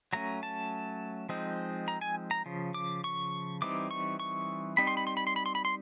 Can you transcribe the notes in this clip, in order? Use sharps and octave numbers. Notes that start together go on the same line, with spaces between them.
F#3 A3 C#4 A#5
A5
F3 G#3 C4 D#4
A#5
G#5
A#5
C#3 F3
D6
C#6
E3 G3 C4 D#4 D6
C#6
C#6
G3 C4 D#4 B5
C6
B5
C6
B5
C6
B5
C6
B5
C6